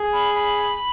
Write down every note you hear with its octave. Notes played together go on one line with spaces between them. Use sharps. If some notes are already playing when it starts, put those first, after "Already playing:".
Already playing: G#4
B5
B5